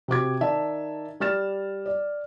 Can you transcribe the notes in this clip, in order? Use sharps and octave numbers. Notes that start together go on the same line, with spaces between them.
C3 F#4 D6 G#6
D#3 D5 E5 A5
G3 D5 F6 A6 E7
D5